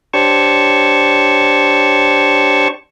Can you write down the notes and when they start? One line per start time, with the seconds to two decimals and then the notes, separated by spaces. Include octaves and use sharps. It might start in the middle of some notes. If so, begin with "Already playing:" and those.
0.14 D4 G4 C5 C#5 A5 C#6